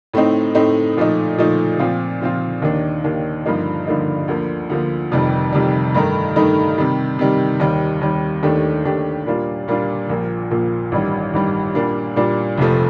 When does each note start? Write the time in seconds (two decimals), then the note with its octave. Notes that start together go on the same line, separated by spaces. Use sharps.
0.14 A2 A3 C4 D#4
0.55 A2 A3 C4 D#4
0.97 A#2 F3 A3 D#4
1.38 A#2 F3 A3 D#4
1.79 A#2 F3 C4 F4
2.21 A#2 F3 C4 F4
2.62 D#2 D#3 A#3 D4
3.04 D#2 D#3 A#3 D4
3.46 G2 D3 F3 A#3 D#4
3.87 G2 D3 F3 A#3 D#4
4.28 D2 D3 F3 A#3
4.70 D2 D3 F3 A#3
5.12 F1 F2 C3 D#3 G3
5.52 F1 F2 C3 D#3 G3
5.95 G2 D#3 A3 D#4 A#4
6.36 G2 D#3 A3 D#4 A#4
6.78 C3 D#3 G3
7.19 C3 D#3 G3
7.60 D#2 D#3 G3
8.01 D#2 D#3 G3
8.43 D#2 D#3 A3 D4 G4
8.85 D#2 D#3 A3 D4 G4
9.26 A#2 G3 A#3 D4 F4
9.68 A#2 G3 A#3 D4 F4
10.09 A#1 A#2 F3 A#3
10.51 A#1 A#2 F3 A#3
10.92 A1 G2 D#3 G3
11.33 A1 G2 D#3 G3
11.75 A#2 G3 A#3 D4
12.16 A#2 G3 A#3 D4
12.58 F1 F2 C3 F3 A3